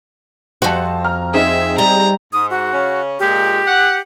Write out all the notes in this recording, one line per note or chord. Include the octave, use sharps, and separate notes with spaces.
F2 F#4 C5 A5
A#5 F6
C4 D#4 G#4 E5
G3 A#5
G#2 D#6
F#4
C#3 C#4
A#2 G#3 G4
F#5